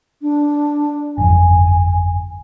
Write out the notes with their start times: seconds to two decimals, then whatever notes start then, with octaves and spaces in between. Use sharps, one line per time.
0.22 D4
1.18 G1 F2 G#5